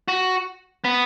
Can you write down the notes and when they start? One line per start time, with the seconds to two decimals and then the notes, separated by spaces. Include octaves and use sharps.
0.08 F#4
0.84 B3